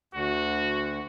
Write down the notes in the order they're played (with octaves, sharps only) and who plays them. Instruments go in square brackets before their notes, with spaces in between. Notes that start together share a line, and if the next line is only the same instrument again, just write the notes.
[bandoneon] D2 [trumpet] F#4